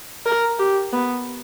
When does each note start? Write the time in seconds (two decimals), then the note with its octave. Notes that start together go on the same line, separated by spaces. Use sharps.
0.26 A#4
0.59 G4
0.93 B3